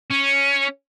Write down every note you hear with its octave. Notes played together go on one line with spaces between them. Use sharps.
C#4